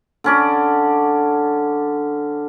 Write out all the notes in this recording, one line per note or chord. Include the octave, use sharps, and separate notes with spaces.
D3 C#4 D5